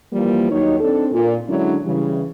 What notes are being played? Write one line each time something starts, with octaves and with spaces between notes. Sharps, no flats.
E3 F3 G3 A#3
D#2 D#3 F#3 D#4 C#5
C4 D4 D#4 A4
A#2
D3 F#3 G#3 C#4 D4 E4
C#3 E3 G3